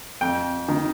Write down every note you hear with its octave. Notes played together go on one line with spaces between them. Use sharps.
F2 G5
D#3